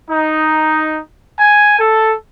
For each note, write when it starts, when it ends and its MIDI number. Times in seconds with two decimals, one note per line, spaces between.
0.11 1.00 63
1.39 1.79 80
1.80 2.15 69